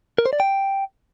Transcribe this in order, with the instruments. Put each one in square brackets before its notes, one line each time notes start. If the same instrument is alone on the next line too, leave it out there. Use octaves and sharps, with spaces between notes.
[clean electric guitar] A#4
C5
D5
G5